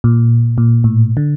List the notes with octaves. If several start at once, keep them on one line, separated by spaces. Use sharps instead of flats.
A#2
A#2
A2
D3